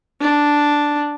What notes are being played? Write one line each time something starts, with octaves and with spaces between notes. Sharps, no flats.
D4